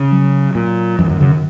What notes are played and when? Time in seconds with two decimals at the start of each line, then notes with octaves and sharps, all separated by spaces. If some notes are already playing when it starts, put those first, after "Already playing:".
Already playing: C#3
0.12 F#3
0.55 A#2
0.98 F#2 E3
1.09 F#2 D#3
1.20 F#2 C#3
1.31 D#3